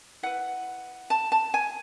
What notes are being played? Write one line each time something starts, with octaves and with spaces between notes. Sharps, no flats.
E4 B4 F#5
A5
A5
G#5